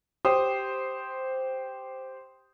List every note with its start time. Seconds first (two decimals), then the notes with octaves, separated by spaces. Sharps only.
0.25 G4 C5 C6 D#6